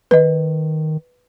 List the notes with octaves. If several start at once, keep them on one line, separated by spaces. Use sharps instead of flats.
D#3 B4 D#5